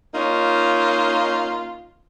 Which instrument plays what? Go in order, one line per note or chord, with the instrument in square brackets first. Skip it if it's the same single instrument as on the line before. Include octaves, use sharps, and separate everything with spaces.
[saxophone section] A#3 C#4 D#4 F4